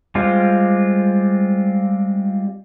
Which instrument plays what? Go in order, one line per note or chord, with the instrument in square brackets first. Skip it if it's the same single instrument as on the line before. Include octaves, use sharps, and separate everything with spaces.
[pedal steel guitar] G3 G#3 C4 F4